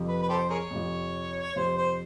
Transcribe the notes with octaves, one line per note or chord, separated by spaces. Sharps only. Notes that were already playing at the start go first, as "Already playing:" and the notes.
Already playing: F2 C3 F3
B4
B4
G4 A4 C5
G#4 A#4 C#5
F2 C3 F3
F2 C3 F3 C5
C5